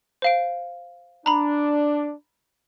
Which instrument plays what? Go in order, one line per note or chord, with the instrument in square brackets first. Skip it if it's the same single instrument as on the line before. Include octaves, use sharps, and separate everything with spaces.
[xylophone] C5 F5 D7
[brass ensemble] D4 [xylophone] A#5 B5